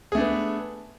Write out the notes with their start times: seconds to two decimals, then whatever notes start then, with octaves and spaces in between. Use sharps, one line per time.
0.12 G#4
0.15 A3
0.18 D4
0.21 B3